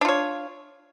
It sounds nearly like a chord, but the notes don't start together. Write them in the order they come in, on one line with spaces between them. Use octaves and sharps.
D4 F4 C#5